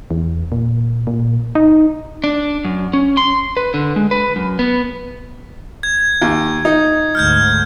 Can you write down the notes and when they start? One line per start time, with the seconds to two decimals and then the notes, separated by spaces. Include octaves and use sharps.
0.11 E2
0.52 A#2
1.07 A#2
1.55 D#4
2.24 D4
2.65 F#2
2.93 C#4
3.17 C6
3.57 B4
3.74 D3
3.96 G#3
4.11 B4
4.36 F#2
4.59 B3
5.83 G#6
6.22 D#2
6.65 D#4
7.15 D2 G#2 F6 G6 G#6